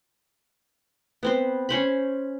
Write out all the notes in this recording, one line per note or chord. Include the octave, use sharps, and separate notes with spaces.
B3 C4 C5
C#4 C5 B5